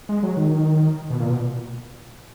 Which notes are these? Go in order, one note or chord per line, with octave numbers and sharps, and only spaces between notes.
G#3
F#3
D#3
B2
A#2
B2